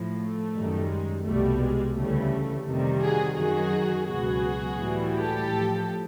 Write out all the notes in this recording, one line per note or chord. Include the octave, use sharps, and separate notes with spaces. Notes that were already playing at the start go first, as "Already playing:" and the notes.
Already playing: A2 F3
A3
F#2 D#3 G3
G#3
C2 B2 G3 A3
G#3
D2 C#3 E3 G3 A3
F2 C3 D#3 G3
F#4 G#4
F#2 D#3 F#3 F#4 G#4
C#2 B2 F#3 F#4 G#4
A2 E3 G3
G4 A4
A2 F3